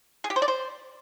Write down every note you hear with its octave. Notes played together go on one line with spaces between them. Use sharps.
G#4
G4
C5
D5
C5